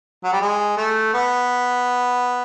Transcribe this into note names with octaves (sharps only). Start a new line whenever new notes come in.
F#3
G3
G#3
A3
B3